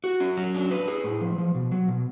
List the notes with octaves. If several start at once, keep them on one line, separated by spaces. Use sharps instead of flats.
F#4
C#4
F#3
D4
B4
G#4
A2
F3
F3
B2
F#3
B2